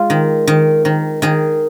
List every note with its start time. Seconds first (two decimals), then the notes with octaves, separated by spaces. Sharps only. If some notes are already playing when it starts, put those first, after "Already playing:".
Already playing: G#3 F4
0.10 D#3
0.47 D#3
0.85 D#3
1.22 D#3 G#4